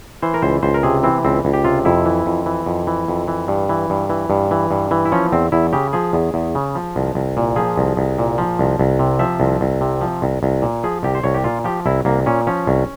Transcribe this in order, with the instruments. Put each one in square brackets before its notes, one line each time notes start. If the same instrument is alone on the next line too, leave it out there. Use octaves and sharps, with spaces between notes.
[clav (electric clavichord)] E3 C5
A#4
C#2 C5
C#2 C5
A#4
C3 G#4
E3 C4
C#2 C4
C#2
G4
C3 F4
F2 E4
E3
F2
E3
F2
E3
F2
E3
G2
E3
G2
E3
G2
E3
G2
E3
E4
F3 C#4
E2 C4
E2 E4
C#3 G4
F3 G#4
E2
E2
C#3
F3
C2
C2
A#2
F3 G#4
C2
C2
A#2
F3
C2
C2
C3
F3 E5
C2
C2
C3
F3
C2
C2
A#2
F3 G#4
C2 G4
C5
C2 C#5
G4
A#2 F4
F3 G4
C2 E4
C2 A#3
A#2 C#4
F3 C#4
C2